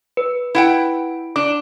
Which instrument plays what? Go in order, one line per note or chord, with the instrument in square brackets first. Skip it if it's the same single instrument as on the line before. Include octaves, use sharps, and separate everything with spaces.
[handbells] B4
[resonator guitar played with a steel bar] E4 F#5 G5
[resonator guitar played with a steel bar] D4 [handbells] D6